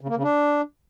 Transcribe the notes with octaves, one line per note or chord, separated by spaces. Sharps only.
C#3
A#3
C#3
D4